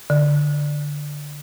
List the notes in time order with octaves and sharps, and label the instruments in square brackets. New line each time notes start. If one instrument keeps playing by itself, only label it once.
[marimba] D3